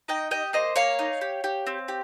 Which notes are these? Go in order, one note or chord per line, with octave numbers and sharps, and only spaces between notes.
D#4 D#5 G5
G4 D#5 G5
A#3 C5 D#5
A#3 C#5 F5
D#4
G4
G4
C4
G4